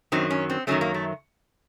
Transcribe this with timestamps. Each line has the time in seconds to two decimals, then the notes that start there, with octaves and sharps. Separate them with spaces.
0.12 F#2 D#3 F#3 C4
0.30 C#4
0.50 C4
0.67 F#2 D#3 F#3 A3 C#4
0.81 A#3
0.94 A3